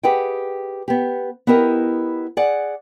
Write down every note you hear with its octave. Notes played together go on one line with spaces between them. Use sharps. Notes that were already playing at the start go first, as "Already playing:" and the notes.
G4 G#4 B4 D#5 F#5 G5
B3 G4
B3 E4 G4 A#4 D#5
G#4 D5 F#5